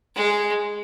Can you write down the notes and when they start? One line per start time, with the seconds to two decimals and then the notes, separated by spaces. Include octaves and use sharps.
0.15 G#3